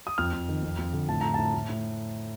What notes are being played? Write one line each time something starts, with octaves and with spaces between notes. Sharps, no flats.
D#6
F2 F6
F2
D#3
F2
F2
D3
A2 A5
A2 A#5
A2 A5
A2
A2